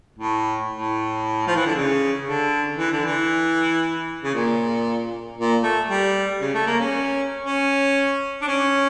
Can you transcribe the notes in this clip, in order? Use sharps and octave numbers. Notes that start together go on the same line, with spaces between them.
A2
A2
F3
E3
D3
C#3
D3
E3
D3
E3
C#3
A#2
A#2
A3
G3
C#3
A3
A#3
C#4
C#4
D4
C#4